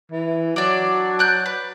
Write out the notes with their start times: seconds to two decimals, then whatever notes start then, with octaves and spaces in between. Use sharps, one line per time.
0.11 E3
0.56 F#3 D4 D5
1.19 D5 F#6 G6
1.46 B4